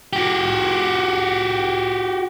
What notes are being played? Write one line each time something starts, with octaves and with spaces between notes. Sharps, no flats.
F#4 G4